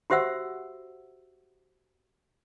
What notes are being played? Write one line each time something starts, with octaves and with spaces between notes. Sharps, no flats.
F#4 G4 C5 E5 F#5 E6